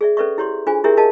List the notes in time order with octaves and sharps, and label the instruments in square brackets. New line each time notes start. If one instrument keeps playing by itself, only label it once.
[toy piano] G#4 D5 E5
C#4 A4 B4 D5 E5 C#6
E4 G4 C#5 D5 C6
D4 F4 G#4 C5 G#5
E4 G4 G#4 A#4 C#5 E5
G#4 A#4 D#5 F5 A5